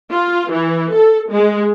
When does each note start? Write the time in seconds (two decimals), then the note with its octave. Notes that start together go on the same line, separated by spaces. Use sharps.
0.12 F4
0.50 E3
0.93 A4
1.32 G#3